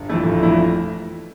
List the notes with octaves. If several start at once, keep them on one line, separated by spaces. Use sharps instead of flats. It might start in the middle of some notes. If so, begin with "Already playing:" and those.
Already playing: G1
F2 E3 A3 E4
G1
F2 E3 A3 E4